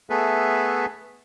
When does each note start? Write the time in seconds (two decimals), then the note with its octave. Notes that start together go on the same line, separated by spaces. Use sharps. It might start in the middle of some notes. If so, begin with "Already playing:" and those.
0.10 A3 B3 G#4 A4 B4 E5